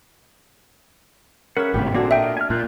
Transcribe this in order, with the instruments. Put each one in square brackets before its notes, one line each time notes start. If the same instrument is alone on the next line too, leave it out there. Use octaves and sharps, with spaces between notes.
[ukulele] C#4 E5 [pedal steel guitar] G#4 B4 F#5 [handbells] A#4
[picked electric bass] G#1 A2 C3 [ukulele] G4
[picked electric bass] A#2 [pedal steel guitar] C4 G#4 [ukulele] D4 F#4 A4
[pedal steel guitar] A#4 D#5 [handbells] E5 G5
[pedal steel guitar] G#5 F6
[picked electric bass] A#2 [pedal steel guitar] D5 F#6 G6